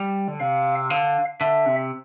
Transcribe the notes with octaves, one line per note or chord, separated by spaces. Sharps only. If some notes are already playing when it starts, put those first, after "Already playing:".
Already playing: G3
D3
C3 F5
D3 F5
D3 E5
C3